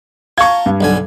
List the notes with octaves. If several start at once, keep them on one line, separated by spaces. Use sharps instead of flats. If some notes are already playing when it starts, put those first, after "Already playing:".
F4 A5 A#5 C#6 G#6
G2
B1 D3 G#5